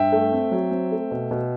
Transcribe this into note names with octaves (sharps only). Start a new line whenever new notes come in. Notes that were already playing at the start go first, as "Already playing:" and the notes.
Already playing: G2 E5 G5
A3
C4
F#3
C4
A3
B2
B2